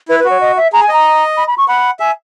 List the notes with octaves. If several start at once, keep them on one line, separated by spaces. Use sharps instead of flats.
E4 B4
B4
F#4
C#5
D#5
E5
G#4 A#5
G#5
D#5 A#5
B5
B5
C#6
F#5 B5
E5 G#5